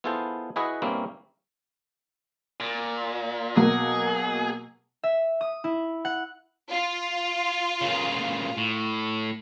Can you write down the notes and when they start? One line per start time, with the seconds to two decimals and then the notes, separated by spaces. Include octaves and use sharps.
0.04 B3 E4 F4 G#4 A4 C5
0.56 E4 F#4 G#4 B4 D#5 F#5
0.82 G2 A#2 A#3 C4 C#4 E4
2.60 A#2
3.56 B2 F#3 A#3 G#4
5.03 E5
5.41 D#6
5.64 E4
6.05 F#5
6.69 F4
7.81 A#2 C#3
8.57 A2